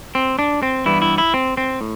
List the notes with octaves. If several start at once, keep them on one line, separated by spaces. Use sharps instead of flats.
C4
D4
C4
G2 E3 G3 B3 E4
E4
E4
C4
C4
A2